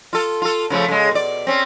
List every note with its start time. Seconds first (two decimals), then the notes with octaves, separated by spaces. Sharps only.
0.13 F4 A4
0.42 F4 A4
0.70 C#3 F3 A3
0.88 C#3 G#3
1.11 B2 D5
1.47 C4 C#4